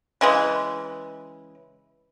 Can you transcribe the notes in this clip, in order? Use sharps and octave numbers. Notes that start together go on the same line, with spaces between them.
C#3 E3 G#3